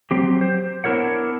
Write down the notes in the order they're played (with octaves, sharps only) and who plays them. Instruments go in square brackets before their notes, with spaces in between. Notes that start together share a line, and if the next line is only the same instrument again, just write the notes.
[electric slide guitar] F#3 C4 G4
C5
B3 D4 E4 A#4 C#5 F#5